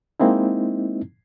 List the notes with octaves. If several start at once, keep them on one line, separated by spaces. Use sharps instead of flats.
G#3 A#3 C4 D#4 E4